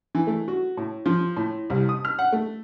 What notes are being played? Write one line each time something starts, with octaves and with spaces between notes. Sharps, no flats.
E3
A3
F#4
A2
F3
A2
C2
D#6
F6
F#5
A3